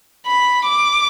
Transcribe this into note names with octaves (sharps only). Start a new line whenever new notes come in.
B5
D6